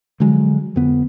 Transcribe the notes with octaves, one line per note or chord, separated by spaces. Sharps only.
D3 F3 F#3 G#3
F2 D3 B3